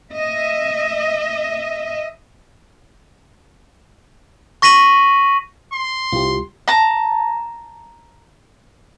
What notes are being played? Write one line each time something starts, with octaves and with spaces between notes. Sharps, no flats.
D#5 E5
C#6 A#6 B6 D#7 F#7
C6
C2 F4 G4
A5 A#5